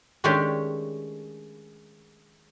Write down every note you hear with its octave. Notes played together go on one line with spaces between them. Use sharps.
D#3 G#3 A3 C#4 D4 G4